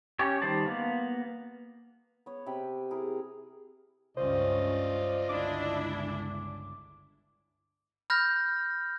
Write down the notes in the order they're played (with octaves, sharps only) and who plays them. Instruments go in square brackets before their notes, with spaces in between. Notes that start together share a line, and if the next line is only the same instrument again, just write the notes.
[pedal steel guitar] C#4 G4 C#5
D#3 G3 C5 D5 A5
A#3 B3
[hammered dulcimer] B3 C#5
C3 G5 B5
E4 G#4 A#4
[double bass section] C#2 G2 C#4 [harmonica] F4 D5 D#5 [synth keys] C5
[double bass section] G1 C#2 [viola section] D4 E4 [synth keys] D6
[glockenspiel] B5 F6 G6 A#6